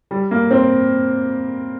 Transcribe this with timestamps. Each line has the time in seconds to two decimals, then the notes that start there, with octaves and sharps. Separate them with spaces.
0.11 G3
0.31 A#3
0.51 C4